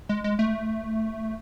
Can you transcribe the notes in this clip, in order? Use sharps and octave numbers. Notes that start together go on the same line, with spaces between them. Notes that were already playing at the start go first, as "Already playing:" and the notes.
G#3
G#3
A3